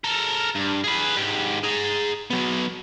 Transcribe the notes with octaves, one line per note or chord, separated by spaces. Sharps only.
A4 A#4
G2
G#4 B4
G#2 G4
G#4 A#5
F#3 B3